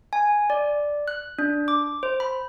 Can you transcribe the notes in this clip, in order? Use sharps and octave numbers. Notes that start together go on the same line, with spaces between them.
G#5
D5
F#6
D4
D6
C5
B5